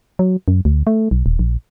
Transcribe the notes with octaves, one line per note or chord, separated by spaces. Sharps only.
F#3
F#2
D2
A3
B1
D#1
A#1